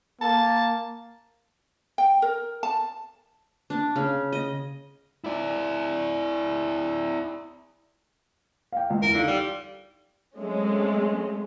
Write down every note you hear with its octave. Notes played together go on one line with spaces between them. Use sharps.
A#3 A5
G5
A#4
A5
D4
C#3
D#5
E4 D5
F5 G5
C#2
E2 A#4
D3 D#4 F4
G3
F#3 G#3 A3 C4 C#4